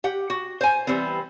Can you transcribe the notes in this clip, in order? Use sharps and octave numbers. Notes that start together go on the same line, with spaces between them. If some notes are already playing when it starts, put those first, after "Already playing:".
G4 F#5
F#4
C5 G#5
E3 G3 B3 C4